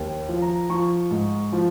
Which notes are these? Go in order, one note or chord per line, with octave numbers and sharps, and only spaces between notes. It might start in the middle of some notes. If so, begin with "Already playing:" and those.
Already playing: D#2
F3
A#5
F3 C#6
G#2
F3